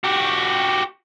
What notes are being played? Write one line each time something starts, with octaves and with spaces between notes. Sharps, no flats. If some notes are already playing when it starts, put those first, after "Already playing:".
F#4 G4